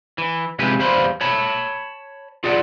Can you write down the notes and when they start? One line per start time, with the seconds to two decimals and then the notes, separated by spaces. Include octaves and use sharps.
0.18 E3
0.59 C3 F3 G#3 E4 G4 B4
0.79 E2 G3 C5 F5 B5 C6
1.21 C#5 A5 B5
2.44 F4 G#4 D5 F#5